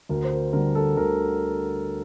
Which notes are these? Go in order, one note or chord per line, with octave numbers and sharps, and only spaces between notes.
D2 A#4
C5
A#4
D3 G3 A#4
A4
D2 A#4